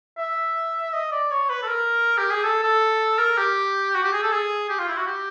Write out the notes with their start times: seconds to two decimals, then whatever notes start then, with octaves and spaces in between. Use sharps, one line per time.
0.18 E5
0.93 D#5
1.12 D5
1.31 C#5
1.50 B4
1.63 A4
1.68 A#4
2.18 G4
2.31 G#4
2.44 A4
2.63 A4
3.19 A#4
3.37 G4
3.94 F#4
4.03 G4
4.13 G#4
4.22 A4
4.32 G#4
4.70 G4
4.79 F4
4.88 E4
4.98 F#4
5.07 G4